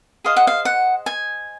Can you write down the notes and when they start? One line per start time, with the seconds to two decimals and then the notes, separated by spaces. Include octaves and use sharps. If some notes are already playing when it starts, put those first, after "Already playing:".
0.24 G#4 C5 D#5 F5
0.36 F#5
0.47 F5
0.65 F#5
1.06 G#5